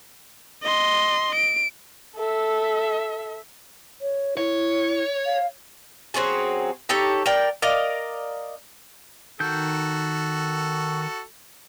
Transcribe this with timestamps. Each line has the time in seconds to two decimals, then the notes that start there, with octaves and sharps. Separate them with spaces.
0.63 D#5 C6
1.35 D7
2.16 A4 E5
4.01 C#5
4.37 E4 C#5
5.26 F5
6.14 F#3 C4 C#4 G#4
6.89 D#4 G4 A4 C#5
7.26 A#4 D5 G5
7.62 A#4 D5 D#5 F5
9.40 D#3 F#4 A4 G6